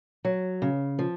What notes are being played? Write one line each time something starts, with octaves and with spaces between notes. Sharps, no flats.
F#3
C#3
F3